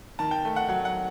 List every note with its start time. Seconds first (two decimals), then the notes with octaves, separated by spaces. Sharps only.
0.19 D#3 A5
0.31 G5
0.45 A3
0.56 F#5
0.68 F#3 F#5
0.85 F#5